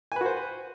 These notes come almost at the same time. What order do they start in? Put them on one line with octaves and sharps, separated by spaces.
G#5 B4 F#4 C5